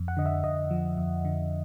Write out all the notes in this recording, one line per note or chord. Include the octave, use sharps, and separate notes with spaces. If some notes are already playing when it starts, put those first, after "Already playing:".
Already playing: F2
F#5
D3 D#5
E5
F2 D#5
F3
F2
D3